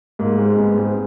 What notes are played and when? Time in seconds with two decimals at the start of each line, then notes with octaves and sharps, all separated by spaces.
0.19 G#2 A#3
0.39 G#3 C4
0.58 G#2 B3
0.78 G#3 C4